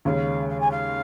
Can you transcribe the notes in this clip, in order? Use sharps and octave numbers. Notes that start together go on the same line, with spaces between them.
D#2 C#3 G#3 C#4 F5
F5
G#5
F5